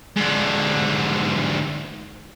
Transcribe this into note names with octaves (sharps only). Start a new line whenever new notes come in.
G#2 D3